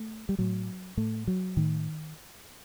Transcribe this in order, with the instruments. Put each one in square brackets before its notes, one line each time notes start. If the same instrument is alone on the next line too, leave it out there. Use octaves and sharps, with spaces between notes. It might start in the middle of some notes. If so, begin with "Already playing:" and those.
Already playing: [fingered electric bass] A3
G3
A2 F#3
A2 A3
F#3
A2 D#3